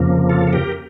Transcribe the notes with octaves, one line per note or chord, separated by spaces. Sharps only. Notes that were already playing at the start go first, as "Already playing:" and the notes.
Already playing: F2 C#3 F3 A#3
F4 A4
A4
G4 A#4